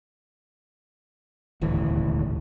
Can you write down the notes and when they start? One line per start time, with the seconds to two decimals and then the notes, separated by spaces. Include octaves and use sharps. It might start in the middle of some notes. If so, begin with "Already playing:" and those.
1.61 D#1 G#1 D2 E3